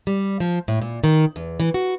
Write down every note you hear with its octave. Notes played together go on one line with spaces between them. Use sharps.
G3
F3
A2
A#2
D#3
E2
E3
F#4